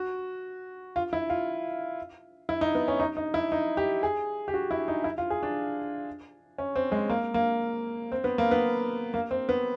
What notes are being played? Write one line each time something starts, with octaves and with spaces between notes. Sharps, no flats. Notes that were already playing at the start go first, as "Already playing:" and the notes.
Already playing: F#4
F4
E4
F4
E4
D#4
B3
C#4
D#4
D#4
E4
D#4
G4
G#4
G4
F#4
E4
D#4
E4
F4
G#4
D4
C#4
C4
G#3
A#3
A#3
C4
B3
A#3
B3
A#3
C4
B3